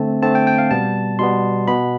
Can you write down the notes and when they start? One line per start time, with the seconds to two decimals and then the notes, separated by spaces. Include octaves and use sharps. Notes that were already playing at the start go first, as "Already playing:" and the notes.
Already playing: D3 A3 C4 A5
0.23 D3 A3 C4 A5
0.35 G5
0.47 G5
0.58 F5
0.71 B2 G3 B3 A5
1.19 B2 G3 B3 C6
1.67 B2 B3 B5